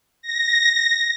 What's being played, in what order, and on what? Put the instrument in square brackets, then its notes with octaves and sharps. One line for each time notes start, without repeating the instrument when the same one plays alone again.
[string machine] A#6